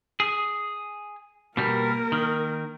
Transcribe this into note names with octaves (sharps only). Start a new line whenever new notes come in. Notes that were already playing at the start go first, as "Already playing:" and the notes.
G#4
B2 G3 A#3 A#4
D#3